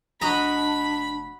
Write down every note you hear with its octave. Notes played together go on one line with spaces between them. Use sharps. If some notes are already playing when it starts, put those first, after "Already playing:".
F1 D4 F#4 D#5 A#5 B5